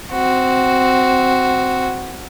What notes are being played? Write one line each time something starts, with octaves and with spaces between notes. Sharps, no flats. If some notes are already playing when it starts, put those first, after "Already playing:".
C4 F#4